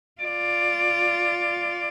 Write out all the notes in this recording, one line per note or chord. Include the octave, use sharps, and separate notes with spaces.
F4 D5